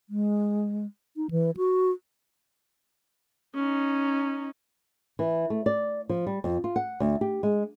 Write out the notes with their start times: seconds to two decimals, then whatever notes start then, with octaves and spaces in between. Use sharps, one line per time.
0.09 G#3
1.16 D#4
1.31 E3
1.57 F#4
3.55 C#4 D#4
5.19 E3
5.50 A3
5.66 D5
6.09 F3
6.27 G3
6.44 F2
6.64 F4
6.76 F#5
7.00 D2
7.21 G4
7.43 G#3